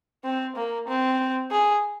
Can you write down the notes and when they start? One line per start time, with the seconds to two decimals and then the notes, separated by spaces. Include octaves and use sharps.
0.24 C4
0.56 A#3
0.88 C4
1.51 G#4